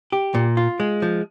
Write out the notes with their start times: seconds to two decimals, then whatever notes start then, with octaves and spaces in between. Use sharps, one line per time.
0.12 G4
0.35 A#2
0.57 F4
0.80 G#3
1.02 F3